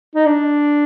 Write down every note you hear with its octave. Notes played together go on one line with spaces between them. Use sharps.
D#4
D4